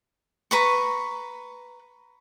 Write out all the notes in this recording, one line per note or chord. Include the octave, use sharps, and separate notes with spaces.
B4 A#5 C#6